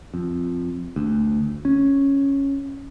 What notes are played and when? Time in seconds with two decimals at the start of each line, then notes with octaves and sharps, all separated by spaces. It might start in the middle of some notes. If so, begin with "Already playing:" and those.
0.14 F2
0.96 D2
1.65 C#4